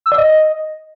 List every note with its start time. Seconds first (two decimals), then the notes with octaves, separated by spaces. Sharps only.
0.06 E6
0.12 D5
0.18 D#5